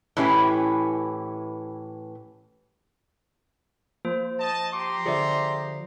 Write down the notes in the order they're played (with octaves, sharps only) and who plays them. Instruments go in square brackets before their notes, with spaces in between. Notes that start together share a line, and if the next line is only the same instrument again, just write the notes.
[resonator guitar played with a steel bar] A2 E3 C#4 E4 G4 B4
[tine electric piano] F3 [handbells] A#3 C5
[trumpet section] D#5 A5
[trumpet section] G4 A#5 C6 [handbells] D6
[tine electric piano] D3 F3 [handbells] G#4 D5 E5